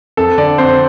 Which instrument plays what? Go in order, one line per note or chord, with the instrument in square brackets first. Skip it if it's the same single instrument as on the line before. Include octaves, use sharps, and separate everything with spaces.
[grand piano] F2 A4
D3 D5
F2 C5